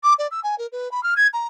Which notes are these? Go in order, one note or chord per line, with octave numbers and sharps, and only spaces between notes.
D6
D5
E6
G#5
A#4
B4
B5
F6
G#6
A#5